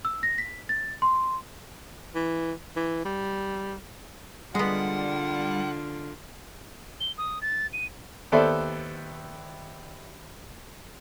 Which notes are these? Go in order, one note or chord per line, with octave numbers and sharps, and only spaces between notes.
E6
A#6
B6
A6
C6
E3
E3
G3
D3 G3 G#3 B3 F4 F#5
G7
D#6
A6
D#7
D#2 B3 A4 C5 D5 E5